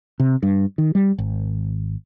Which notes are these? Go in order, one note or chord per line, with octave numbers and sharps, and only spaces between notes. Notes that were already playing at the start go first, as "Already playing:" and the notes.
C3
G2
D#3
G3
G#1